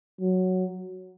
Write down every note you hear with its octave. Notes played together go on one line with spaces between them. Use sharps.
F#3